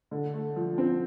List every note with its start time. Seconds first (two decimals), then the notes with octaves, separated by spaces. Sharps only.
0.11 D3
0.34 A3
0.56 F3
0.78 C4